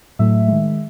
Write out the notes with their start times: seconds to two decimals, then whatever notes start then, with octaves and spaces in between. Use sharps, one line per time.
0.19 A2 F#3 A3 E5
0.48 D#3 G#3